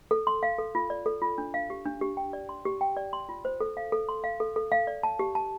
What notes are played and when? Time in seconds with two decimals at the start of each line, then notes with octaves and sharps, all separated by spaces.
0.11 A4
0.27 C6
0.43 F5
0.58 A4
0.75 F4
0.90 D5
1.06 A4
1.22 F4
1.38 D4
1.54 F5
1.70 G4
1.86 D4
2.01 G4
2.17 G5
2.33 D5
2.49 C6
2.65 G4
2.81 G5
2.97 D5
3.13 C6
3.29 F4
3.45 C5
3.61 A4
3.77 F5
3.92 A4
4.09 C6
4.24 F5
4.40 A4
4.56 A4
4.72 F5
4.87 D5
5.03 A5
5.19 G4
5.35 A5